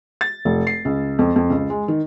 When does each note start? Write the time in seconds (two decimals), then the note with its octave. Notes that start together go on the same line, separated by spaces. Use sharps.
0.21 A6
0.45 F1
0.67 C7
0.85 C#2
1.19 F2
1.36 F2
1.50 C#2
1.70 G#3
1.88 D#3